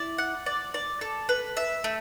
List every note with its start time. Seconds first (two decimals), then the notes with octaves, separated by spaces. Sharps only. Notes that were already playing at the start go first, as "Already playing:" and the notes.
Already playing: E4 D5
0.18 F#5
0.46 D5
0.74 D5
1.01 A4
1.29 B4
1.57 E5
1.84 A3